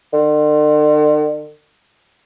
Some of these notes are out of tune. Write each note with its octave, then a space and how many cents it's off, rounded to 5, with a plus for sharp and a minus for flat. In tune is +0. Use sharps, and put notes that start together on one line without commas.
D3 +45